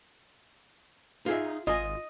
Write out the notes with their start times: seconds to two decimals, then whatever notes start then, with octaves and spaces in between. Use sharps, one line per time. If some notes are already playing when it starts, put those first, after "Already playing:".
1.26 D#4 F4 G#4 E5
1.67 G#1 F4 D#5 G#5